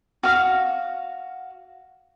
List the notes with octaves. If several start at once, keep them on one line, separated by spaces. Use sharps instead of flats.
F#4 F5